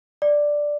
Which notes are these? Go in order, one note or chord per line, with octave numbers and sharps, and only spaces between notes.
D5